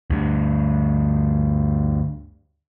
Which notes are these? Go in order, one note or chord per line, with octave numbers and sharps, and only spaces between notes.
D2 G2